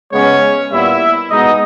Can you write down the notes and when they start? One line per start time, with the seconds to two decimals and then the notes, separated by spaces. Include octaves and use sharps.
0.12 C#3 G#3 B3 C#4 C#5
0.71 A#2 G3 B3 E4 E5
1.30 B2 G#3 B3 D#4 D#5